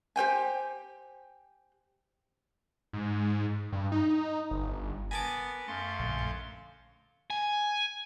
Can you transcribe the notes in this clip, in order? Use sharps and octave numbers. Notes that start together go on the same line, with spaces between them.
G4 C5 G5 G#5
G#2
G2
D#4
G1
B3 A#4 B4 G#5 A5 D6
F#2 A3 F5 C6 C#6
A#1 D3
G#5